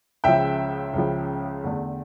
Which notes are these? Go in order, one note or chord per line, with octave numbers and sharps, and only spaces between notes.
C#2 C#3 F3 E5 G5
C#2 C#3 F3
E2 D3 A3